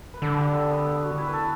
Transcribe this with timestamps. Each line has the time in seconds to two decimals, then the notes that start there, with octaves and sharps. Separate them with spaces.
0.14 B4
0.22 D3 A4
0.38 G4
0.54 A4
0.70 B3
0.86 B3
1.02 F#4
1.18 E4
1.28 B4
1.33 A4